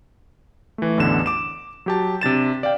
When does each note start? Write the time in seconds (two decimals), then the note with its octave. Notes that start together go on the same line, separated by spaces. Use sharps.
0.78 E3 A3
0.98 A1 E2 D3 E7
1.26 D6 E7
1.86 F#3 G4 A5
2.21 C3 D4 A6 E7
2.63 D5 F5 G5